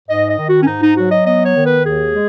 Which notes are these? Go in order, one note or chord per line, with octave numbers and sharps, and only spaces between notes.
G#2 D#5
D#5
D#3
F#4
C#4
G#2 D#4
D#4
F#3 F#4
D#5
B3 D#5
C#5
D#3
B4
D#2 G#4
G#3